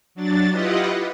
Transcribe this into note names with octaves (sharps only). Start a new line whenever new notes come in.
F#3 D4 A6
E4 F4 G4 B4 D#5 F#5